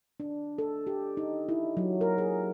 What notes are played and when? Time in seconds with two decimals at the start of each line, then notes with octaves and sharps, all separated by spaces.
0.20 D4
0.58 A4
0.87 G4
1.17 D#4
1.49 E4
1.77 F#3
2.01 A#4
2.18 G#4